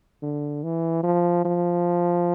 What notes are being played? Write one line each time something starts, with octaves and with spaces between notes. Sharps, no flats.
D3
E3
F3
F3